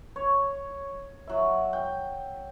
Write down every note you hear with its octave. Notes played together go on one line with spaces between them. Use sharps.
C#5
F#3 E5
G5